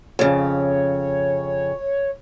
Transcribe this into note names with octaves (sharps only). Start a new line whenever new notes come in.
F2 C#3 C#5